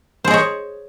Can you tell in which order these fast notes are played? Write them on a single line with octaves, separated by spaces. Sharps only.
C5 G#4 D#5 C#5